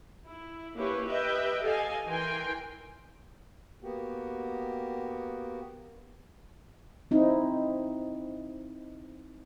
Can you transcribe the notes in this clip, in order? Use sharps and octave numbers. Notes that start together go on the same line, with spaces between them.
E4
A#3 C#4 E4 G4 B4 C#5
G4 B4 D#5 E5 G5
G4 A4 D#5 F5 G#5
E3 A#4 G5 G#5 C6
A#3 B3 F#4 G4
C4 D#4 E4